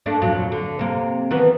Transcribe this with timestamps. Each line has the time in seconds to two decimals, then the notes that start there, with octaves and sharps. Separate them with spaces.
0.06 A3 A#3 D4
0.21 F2 A#2 F#3
0.52 D3
0.79 C3 A#3
1.31 D#3 E3 B3